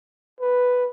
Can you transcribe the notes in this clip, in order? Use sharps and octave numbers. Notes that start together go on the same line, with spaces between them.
B4